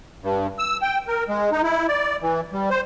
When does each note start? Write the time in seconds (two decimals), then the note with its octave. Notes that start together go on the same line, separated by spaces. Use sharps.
0.23 G2
0.59 E6
0.82 G5
1.08 A#4
1.29 G#3
1.52 D#4
1.63 E4
1.88 D5
2.22 E3
2.53 G3
2.70 C5